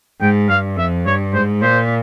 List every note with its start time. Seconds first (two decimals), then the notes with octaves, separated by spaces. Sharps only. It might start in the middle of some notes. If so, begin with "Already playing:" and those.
0.21 G#2 G5
0.49 G2 F5
0.77 F2 E5
1.06 G2 C#5
1.33 G#2 C5
1.62 A#2 C5